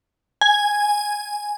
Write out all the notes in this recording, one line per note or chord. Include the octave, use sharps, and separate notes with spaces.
G#5